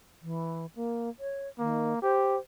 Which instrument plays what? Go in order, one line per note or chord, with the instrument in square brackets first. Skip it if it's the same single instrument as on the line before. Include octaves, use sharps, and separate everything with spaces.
[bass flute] E3
A#3
C#5
[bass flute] D#3 [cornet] A#3
[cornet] G4 [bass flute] C5